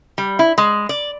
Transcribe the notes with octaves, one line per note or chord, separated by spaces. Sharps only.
G3
E4
G#3
D5